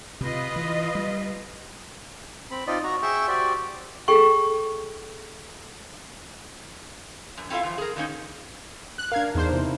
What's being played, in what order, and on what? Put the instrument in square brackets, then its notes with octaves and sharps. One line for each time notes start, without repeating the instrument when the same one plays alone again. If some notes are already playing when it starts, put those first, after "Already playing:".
[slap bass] C3 [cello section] F4 B4 D#5
[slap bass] E3
G3
[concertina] C4 B5
C4 D#4 F4 D5 D#5
F#4 A#5
G#4 E5 G5 C#6 E6
F#4 G4 C5 D5
[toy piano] G#4 A4 G5 C#6
[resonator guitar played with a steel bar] F#2
C4 E4 F4 A4 E5 F5
E3 F3
G#4 A#4
D3 D#3 F#3 A#3 C#4 D#4
[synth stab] F#6
[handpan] D4 A#4 [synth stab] F5 G#6
[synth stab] E2 C5 [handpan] D#4
[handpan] C3 E4